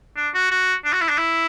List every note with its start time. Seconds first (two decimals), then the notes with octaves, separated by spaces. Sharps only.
0.17 D4
0.34 F#4
0.51 F#4
0.85 D4
0.93 F#4
1.01 E4
1.09 D4
1.18 E4